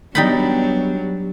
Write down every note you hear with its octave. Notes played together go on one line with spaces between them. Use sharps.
F#3 G3 B3 D4 D#4 B5